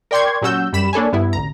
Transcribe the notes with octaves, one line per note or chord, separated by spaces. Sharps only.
A#4 D5 G5 C6 C#6 G#6
A#2 F#3 C#4 F#4 E6 G6
F#2 G3 B5 E7
A#3 D4 A4 C#5 G#5
G2 B3 E4
A1 D2 A#5